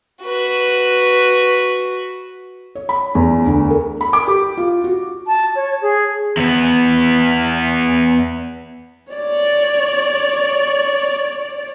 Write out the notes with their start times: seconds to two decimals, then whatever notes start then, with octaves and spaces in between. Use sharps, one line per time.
0.22 F#4 B4
2.75 C#5
2.89 B5
3.15 E2
3.46 D2
3.71 A#4
4.01 B5
4.13 D6
4.28 G4
4.57 F4
4.84 F#4
5.27 A5
5.56 C#5
5.82 G#4
6.37 E2 B3
9.13 C#5 D5